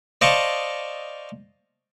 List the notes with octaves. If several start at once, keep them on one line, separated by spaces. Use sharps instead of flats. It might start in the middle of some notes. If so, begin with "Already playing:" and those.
C5 D5 D#5 F5 A5 C#6